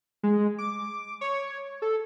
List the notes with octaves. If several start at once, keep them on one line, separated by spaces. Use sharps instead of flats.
G#3
D6
C#5
A4